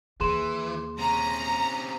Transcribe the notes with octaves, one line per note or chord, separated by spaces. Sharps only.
D#2 E3 G#4 C6 E7
C3 C#4 A#5